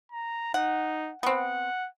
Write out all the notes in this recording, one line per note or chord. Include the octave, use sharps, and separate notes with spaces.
A#5
D#4 F#5
B3 C4 F#5